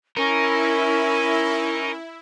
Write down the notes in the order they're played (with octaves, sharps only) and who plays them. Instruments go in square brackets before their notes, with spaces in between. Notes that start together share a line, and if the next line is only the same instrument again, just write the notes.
[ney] C#4 [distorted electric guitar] D#4 [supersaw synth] E4 [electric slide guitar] A#4